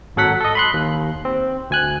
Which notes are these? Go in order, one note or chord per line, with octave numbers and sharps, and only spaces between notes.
G#1 F#3 A4 F#5 B6
A4 D#5
B5 C6 F#6
D#2
C4
D2 G#5 F#6